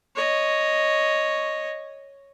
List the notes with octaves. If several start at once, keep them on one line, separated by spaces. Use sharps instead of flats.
C#5 D#5